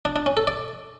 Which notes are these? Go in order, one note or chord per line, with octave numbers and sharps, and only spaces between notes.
D4
D4
C#4
A4
D5